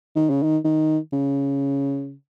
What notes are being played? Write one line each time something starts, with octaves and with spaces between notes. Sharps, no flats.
D#3
C#3
D#3
D#3
C#3